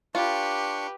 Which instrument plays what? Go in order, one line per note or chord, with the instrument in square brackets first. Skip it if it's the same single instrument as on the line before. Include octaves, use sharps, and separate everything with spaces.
[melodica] D4 C#6 [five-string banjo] F4 [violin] G4 B4